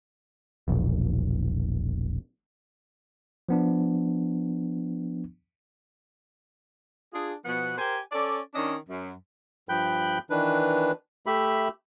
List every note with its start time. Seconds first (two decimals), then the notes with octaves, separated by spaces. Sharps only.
0.68 E1 A#1
3.49 F3 B3 D4
7.14 D4 F4 G#4
7.45 B2 F3 B3 F#5
7.78 G4 A#4 C5 G#5
8.12 C#4 A4 D5
8.55 D#3 C#4 D4 C#5 D#5
8.89 F#2
9.69 G2 F3 G5 B5 F#6 G6
10.30 D#3 E3 D4 B4
11.26 A3 G4 E5 B5